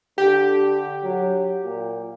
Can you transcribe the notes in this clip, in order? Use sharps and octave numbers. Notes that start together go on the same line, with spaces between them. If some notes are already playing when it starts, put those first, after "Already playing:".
D3 G4
F#3
A#2